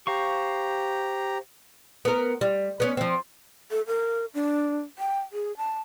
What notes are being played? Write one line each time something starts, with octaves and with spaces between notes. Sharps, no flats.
G4 C5 F5 A#5 C#6
B3 A#4
G3
B3 C#4
F3 C4
A4
A#4
D4
G5
G#4
A5